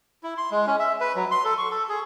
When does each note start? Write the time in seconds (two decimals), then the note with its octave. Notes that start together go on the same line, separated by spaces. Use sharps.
0.23 E4
0.37 C6
0.51 G#3
0.67 C#4
0.79 E5
1.01 B4
1.15 F#3
1.31 C6
1.45 A4
1.58 C#6
1.70 A4
1.89 G#4